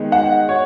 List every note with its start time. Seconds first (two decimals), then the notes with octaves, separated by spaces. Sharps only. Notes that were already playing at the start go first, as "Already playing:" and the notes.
Already playing: D#3 G#3 B3
0.12 F#5
0.49 C#5